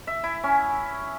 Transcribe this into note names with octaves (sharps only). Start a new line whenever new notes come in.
E5
E4
C#4